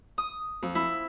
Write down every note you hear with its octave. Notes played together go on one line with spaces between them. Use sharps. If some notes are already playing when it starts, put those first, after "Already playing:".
D#6
F2
E4